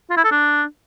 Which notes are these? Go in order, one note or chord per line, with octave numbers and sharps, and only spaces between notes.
F4
E4
A4
D4